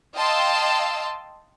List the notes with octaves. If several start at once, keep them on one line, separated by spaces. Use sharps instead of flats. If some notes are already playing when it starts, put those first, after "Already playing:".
D#5 F5 G5 A5 C6 E6